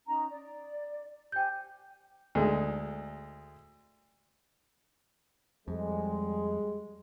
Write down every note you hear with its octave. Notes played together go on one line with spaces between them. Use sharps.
C#4 D#4 A#5
D5
G4 C5 G5 G#5 G6
D2 G#3
F2 G3 G#3